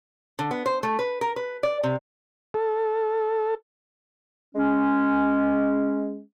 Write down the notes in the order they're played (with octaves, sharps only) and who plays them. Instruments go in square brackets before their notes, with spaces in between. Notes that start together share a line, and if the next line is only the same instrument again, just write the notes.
[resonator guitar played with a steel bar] D3
B3
C5
A3
B4
A#4
B4
D5
C3
[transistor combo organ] A4
[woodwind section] G#3 C#4